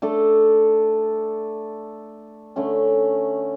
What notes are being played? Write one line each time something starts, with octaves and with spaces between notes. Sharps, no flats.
A3 D4 A4
D3 A3 C#4